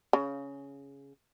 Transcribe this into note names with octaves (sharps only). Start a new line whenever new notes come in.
C#3